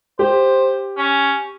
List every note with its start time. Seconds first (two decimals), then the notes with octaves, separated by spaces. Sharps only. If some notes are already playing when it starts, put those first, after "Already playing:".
0.19 G4 C5
0.97 C#4